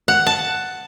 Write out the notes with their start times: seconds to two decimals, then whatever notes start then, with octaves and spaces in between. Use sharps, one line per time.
0.08 F#5
0.27 A5